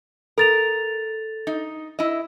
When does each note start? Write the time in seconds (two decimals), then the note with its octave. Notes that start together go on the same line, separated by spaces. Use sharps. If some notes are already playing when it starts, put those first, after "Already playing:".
0.38 A4 A#4 A6 F7
1.47 D#4
1.99 E4 D#5